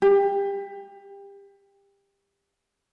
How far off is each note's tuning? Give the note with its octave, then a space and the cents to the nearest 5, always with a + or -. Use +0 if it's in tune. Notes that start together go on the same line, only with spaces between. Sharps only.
G4 +25